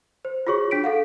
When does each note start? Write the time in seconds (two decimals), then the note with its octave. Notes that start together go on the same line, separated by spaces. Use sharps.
0.25 C5
0.47 F4 F#4 G#4 C#5 C#6
0.71 D4 B6 D7
0.84 A4 F5 F#5